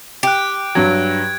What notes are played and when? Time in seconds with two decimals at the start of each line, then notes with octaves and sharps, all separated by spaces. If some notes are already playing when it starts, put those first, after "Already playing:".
0.23 G4 F#6 D7
0.75 G2 F#3 G#6